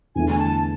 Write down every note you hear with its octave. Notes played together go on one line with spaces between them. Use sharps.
E2 D3 A3 E4 G#5
G#5
A5